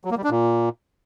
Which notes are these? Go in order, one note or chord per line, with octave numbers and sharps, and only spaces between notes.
F#3
A#3
G3
D4
A#2